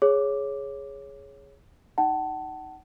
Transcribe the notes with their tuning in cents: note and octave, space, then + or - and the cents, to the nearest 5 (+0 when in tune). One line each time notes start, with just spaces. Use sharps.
G#4 +0 C#5 +0 D6 +0
D#4 +0 F#5 +35 A5 +0